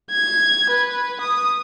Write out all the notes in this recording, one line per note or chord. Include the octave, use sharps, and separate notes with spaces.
G#6
B4
D#6